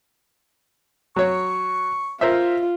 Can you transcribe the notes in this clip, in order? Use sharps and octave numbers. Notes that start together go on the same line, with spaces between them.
F#3 C#5 C#6
F4 A#4 C5 E5